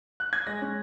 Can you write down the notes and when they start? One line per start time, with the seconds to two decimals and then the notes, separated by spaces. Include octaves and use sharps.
0.20 F#6
0.33 G#6
0.47 G#3 A#6
0.61 C#4